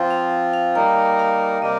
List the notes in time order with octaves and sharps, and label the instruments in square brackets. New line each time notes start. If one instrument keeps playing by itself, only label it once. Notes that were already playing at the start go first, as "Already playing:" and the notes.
Already playing: [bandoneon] F3 C4 F4 [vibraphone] G5
[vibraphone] F5
F5
[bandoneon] G3 A#3 D#4 A#4 [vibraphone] G5
[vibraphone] F5
[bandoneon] C3 G3 A#3 G4 A#4 [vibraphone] D#5